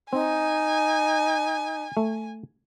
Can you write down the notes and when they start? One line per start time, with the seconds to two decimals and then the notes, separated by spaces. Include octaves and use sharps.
0.13 C4 D#4 G#5
1.97 A3